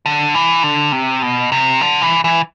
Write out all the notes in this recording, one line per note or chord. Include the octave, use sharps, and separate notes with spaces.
D3
E3
D3
C3
B2
C3
D3
E3
E3